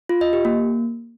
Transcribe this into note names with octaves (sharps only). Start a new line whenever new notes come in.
F4
D#5
G4
A#3